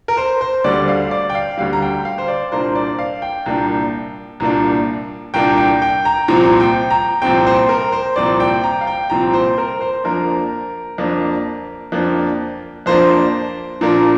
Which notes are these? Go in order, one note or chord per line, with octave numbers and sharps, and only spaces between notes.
A#4
C5
C5
D2 D3 G3 D5
F5
D5
G5
F5
D2 D3 G3 F5
A#5
G5
F5
C5
D5
C2 A#2 A#3 D4 C5
D5
F5
G5
C2 A#2 A#3 D4
C2 A#2 A#3 D4
C2 A#2 A#3 D4 G5
G5
G5
A#5
C2 A#2 F3 C4 A#5
G5
A#5
C2 A#2 F3 C4 G5
C5
A#4
C5
C2 A#2 F3 C4 D5
G5
A#5
F5
G5
C2 A#2 F3 C4 A#5
C5
A#4
C5
F2 F3 A#3 D4 A#4
F2 F3 A#3 D4
F2 F3 A#3 D4
F2 F3 A#3 D4 C5
A#2 F3 A#3 D4